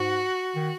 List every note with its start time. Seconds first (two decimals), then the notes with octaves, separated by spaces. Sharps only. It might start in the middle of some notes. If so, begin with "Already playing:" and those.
Already playing: G#2 F#4
0.55 D#3